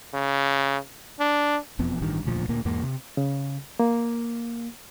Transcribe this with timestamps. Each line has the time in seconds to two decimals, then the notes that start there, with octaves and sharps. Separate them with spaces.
0.14 C#3
1.20 D4
1.79 E1 F2 B3
2.01 A1 G2 D#3
2.24 E1 D2 A#2 F3
2.49 D2 A#2 A#3
2.65 E2 G#2 A#3
2.83 C3
3.17 C#3
3.80 A#3